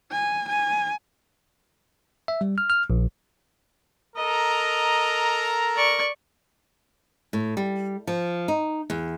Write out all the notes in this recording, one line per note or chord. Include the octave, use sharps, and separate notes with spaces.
G#5
G#5
E5
G3
F6
F6
A#1
A4 A#4 D#5 A#5
D5 C#6
A2
G3
F3
D#4
E2